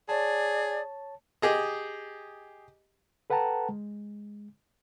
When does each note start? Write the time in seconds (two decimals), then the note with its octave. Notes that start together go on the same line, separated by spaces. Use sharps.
0.09 G#4 C#5 D5 A5
1.42 G4 G#4 D#5
3.30 A4 B4 F#5 G5 A5 A#5
3.69 G#3